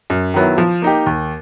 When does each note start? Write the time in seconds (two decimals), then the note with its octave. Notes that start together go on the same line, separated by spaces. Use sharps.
0.10 F#2
0.34 D#3 F#3 B3 E4
0.58 F3
0.82 A#3 D#4 G4
1.06 D#2